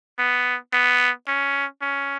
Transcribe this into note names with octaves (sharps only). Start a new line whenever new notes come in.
B3
B3
C#4
C#4